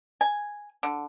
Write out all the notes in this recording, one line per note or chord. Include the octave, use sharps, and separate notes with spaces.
G#5
D3